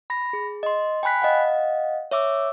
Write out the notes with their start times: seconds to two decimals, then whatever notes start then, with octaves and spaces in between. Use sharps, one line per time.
0.10 B5 A#6
0.33 G#4
0.63 D#5 C6
1.03 G5 G#5 B5 F#6 B6
1.22 D#5 F5 F#5
2.11 C#5 E5 D6 E6